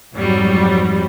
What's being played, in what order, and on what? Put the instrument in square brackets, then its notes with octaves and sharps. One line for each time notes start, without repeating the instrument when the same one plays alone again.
[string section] F2 G#2 F#3 G3